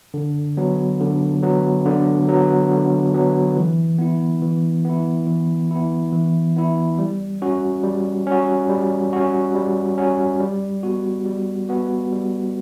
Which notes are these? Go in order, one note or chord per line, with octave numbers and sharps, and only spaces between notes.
D3
F#3 B3
D3
F#3 B3
D3
F#3 B3
D3
F#3 B3
E3
B3 E4
E3
B3 E4
E3
B3 E4
E3
B3 E4
G3
C#4 F#4
G3
C#4 F#4
G3
C#4 F#4
G3
C#4 F#4
G3
B3 F#4
G3
B3 F#4
G3